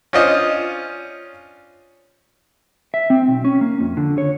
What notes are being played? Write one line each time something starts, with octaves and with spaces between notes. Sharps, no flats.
C#4 D4 F4 C5 D#5
E5
C4
B1
C#4
A#3
F2
D3
C#5